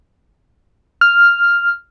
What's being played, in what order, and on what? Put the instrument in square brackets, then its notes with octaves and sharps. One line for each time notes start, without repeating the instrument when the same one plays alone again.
[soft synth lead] F6